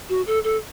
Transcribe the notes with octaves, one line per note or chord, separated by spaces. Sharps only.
F#4
A4
A4